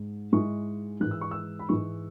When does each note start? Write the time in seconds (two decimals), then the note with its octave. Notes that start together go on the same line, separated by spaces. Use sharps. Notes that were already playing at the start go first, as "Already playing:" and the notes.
Already playing: G#2
0.32 G#2 G#3 E4 C#6
1.01 G#2 E3 G#3 F#6
1.11 E6
1.21 C#6
1.31 E6
1.59 B5
1.69 G#2 E3 G#3 C#6